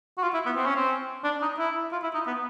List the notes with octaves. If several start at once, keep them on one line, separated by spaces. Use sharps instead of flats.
F#4
F4
E4
B3
C4
C#4
C4
D4
D#4
E4
F4
E4
D#4
B3